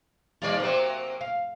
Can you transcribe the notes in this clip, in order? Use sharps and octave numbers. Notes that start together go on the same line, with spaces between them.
D#2 G3 F4 C#5 D5
C3 F#3 A#3 C5 D5
F5